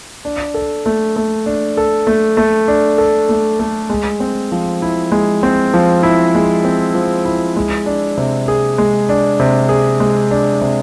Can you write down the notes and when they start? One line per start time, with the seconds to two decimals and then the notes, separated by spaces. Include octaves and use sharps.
0.25 D4
0.54 A4
0.86 A3
1.16 A3
1.46 D4
1.77 A4
2.07 A3
2.37 A3
2.68 D4
2.98 A4
3.29 A3
3.59 A3
3.90 G#3
4.20 C4
4.52 F3
4.82 E4
5.12 G#3
5.43 C4
5.74 F3
6.03 E4
6.35 G#3
6.64 C4
6.95 F3
7.25 E4
7.56 G#3
7.86 D4
8.17 C3
8.48 G#4
8.78 G#3
9.09 D4
9.40 C3
9.69 G#4
10.00 G#3
10.31 D4
10.61 C3